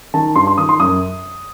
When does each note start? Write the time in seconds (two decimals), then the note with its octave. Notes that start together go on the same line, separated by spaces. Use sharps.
0.14 D#3 A5
0.36 G2 C6
0.47 C6
0.58 D#3 D#6
0.69 C6
0.80 F#2 D#6